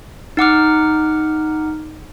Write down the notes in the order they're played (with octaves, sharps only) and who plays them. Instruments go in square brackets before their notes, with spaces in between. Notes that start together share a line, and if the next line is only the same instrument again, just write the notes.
[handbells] D#4 F#5 D6 F6